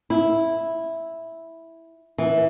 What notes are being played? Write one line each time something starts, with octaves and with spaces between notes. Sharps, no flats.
E4
E3